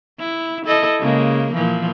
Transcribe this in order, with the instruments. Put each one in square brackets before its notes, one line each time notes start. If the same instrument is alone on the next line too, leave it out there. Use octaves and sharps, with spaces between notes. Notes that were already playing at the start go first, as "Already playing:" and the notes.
[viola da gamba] E4
E4 A4 D#5
C#3 G#3 A#3
A#2 E3 F3